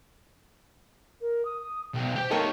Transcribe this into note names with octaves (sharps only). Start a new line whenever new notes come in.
A#4
D#6
B1 G5
G4 C5 G5
A#3 D#4 G4 A4 C#5 C#6